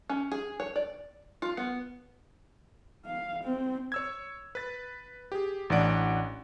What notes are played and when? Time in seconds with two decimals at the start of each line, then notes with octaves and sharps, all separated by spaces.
0.10 C#4
0.32 G#4
0.60 C#5
0.76 D5
1.42 F4
1.57 B3
3.05 F5
3.44 C4
3.92 C#5 E6 G#6
4.55 B4 A6
5.32 G4 G#4
5.70 A1 E3 D4 D5 F#5 D7